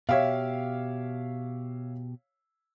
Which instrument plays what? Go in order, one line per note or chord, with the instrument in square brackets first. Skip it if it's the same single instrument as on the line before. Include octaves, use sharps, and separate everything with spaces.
[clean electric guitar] B2 G4 [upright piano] C#5 E5 F5